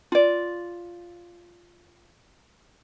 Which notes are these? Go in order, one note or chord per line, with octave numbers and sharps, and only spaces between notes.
F4 D5